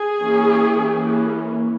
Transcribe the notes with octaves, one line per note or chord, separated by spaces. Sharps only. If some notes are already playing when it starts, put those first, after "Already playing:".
Already playing: G#4
E3 A#3 C#4
E3 A#3 C#4